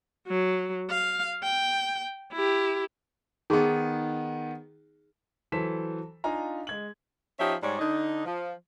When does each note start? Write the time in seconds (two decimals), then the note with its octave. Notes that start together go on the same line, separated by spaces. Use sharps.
0.28 F#3
0.90 F5
1.44 G5
2.33 E4 G4
3.50 D#3 B3 D#4 G#4 C6
5.52 E3 F#3 A4 C5 B6 E7
6.24 D4 D#4 F4 F5 G#5 A#5
6.67 G#3 G#6 F#7
7.40 F3 C#4 D#4 G4 E5
7.62 G#2 G3 C#5 D5
7.79 D3 D4 D#4
8.26 F3